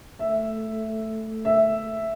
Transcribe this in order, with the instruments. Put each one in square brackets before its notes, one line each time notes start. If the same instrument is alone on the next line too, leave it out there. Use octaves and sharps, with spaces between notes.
[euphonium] A3 [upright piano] E5
[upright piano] E5